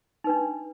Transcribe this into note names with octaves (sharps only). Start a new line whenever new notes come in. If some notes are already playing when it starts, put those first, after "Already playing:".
D4 D#4 B4